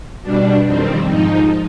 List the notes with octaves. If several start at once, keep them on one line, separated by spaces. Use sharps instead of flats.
B2 G3 D4
F2 D#3 G3 C4
G#2 F3 D#4